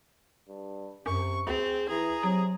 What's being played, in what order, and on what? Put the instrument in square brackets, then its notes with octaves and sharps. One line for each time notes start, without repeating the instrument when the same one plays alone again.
[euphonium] G2
[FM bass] F#2 [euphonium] C3 [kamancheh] C#6
[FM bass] D2 [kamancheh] C4 [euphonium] G#4
[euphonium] E3 [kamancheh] G#4 A#5
[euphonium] C3 [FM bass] F#3